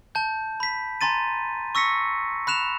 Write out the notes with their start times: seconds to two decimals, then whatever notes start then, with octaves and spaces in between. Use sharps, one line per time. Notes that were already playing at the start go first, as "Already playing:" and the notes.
0.15 A5 G6
0.60 B5 B6
1.01 G#5 A#5 C6 A6 D#7
1.75 C#6 E6 A#6 B6 C#7
2.47 B5 F#6 E7 F7